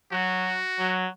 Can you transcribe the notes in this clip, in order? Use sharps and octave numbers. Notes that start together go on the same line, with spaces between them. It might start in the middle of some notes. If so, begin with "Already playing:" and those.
F#3 F#4
F#3